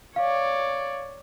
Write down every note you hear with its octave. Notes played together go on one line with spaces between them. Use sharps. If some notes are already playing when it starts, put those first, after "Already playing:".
C#5 D5 F5